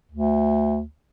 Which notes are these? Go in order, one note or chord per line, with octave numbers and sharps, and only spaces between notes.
D2